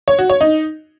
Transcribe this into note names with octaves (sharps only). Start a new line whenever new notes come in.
C#5
F#4
C#5
D#4